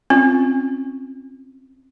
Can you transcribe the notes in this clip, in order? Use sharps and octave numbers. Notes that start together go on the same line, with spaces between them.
C4 C#4 F4